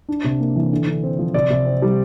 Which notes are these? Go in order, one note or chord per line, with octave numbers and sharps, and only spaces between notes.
D4
C3
A#3
E3
D3
D3
C4
F3
C3 D5
C3
C4
G3